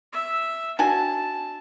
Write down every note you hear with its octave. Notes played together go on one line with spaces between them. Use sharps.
E5
D4 F#4 G#5 A5